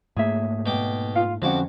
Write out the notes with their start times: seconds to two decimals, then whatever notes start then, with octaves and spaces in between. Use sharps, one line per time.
0.17 G#2 A3 A#3 G#4 E5
0.66 B2 G5 D6
1.15 F4 F5
1.42 F2 D3 F3 C#4 F#4 F#5 A5 D6